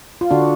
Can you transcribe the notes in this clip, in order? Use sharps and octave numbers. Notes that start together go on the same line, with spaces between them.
F4
D3 D4 F#4